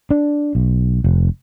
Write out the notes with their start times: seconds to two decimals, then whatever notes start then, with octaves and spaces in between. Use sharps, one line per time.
0.11 D4
0.55 B1
1.04 F1